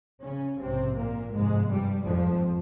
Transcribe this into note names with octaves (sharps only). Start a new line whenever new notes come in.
C#3 C#4
A#1 G#2 C3 C4
A#2 A#3
G1 F2 G#2 C3 G#3
G2 G3
G#1 F2 G#2 F3